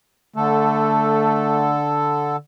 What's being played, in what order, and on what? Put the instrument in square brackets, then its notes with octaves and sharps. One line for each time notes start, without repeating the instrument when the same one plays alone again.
[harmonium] D3 A4 [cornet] A3